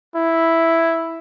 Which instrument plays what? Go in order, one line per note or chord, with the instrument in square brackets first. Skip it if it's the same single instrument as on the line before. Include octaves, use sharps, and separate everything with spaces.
[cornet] E4